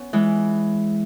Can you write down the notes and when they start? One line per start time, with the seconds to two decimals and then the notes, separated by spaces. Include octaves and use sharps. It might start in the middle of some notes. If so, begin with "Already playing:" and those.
Already playing: B3 C#4
0.13 E3 G#3